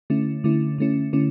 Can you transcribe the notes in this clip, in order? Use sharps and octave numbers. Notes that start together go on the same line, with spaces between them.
D3 A3 C#4 E4
D3 A3 C#4 E4
D3 A3 C#4 E4
D3 A3 C#4 E4